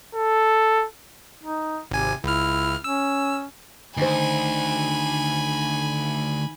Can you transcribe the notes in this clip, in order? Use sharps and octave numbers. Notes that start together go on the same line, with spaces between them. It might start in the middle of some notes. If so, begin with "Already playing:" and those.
A4
D#4
G#1 C3 G#5
C#2 E4 F6
C#4 E6
D2 D#3 C5 G#5 B5